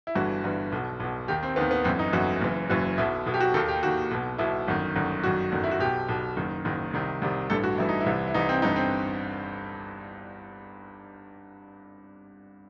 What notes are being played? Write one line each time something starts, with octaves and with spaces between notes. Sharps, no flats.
E4
G1 G2 E3 F#4
G1 G2 E3
B1 B2
B1 B2
D#2 D#3 G4
C4
D#2 D#3 B3
B3
G1 F#2 E3 C4
D#4
G1 F#2 E3 F#4
F#1 F#2 E3
F#1 F#2 E3 F#4
B1 B2 E4
B1 B2
G4
F#4
D#2 D#3 A4
G4
D#2 D#3 F#4
B1 B2
B1 B2 E4
G1 F#2 D#3
G1 F#2 D#3
G1 F#2 D#3 F#4
G1 F#2 D#3
E4
F#4
B1 B2 G4
B1 B2
F#1 F#2 D#3
F#1 F#2 D#3
C2 C3 D#3
C2 C3 D#3
A1 G2 E3 A4
F#4
A1 G2 E3 E4
D#4
E4
C2 C3 E3
E4
C2 C3 E3 D#4
C4
G1 G2 E3 D#4
C4